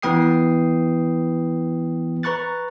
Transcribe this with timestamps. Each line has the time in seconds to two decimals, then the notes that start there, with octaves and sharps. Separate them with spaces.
0.02 E3 B3 B4 G5 D#6 C7
2.23 B4 A#5 C#6 F#6 A6